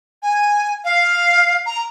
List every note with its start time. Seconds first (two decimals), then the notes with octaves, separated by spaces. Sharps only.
0.22 G#5
0.84 F5
1.66 A#5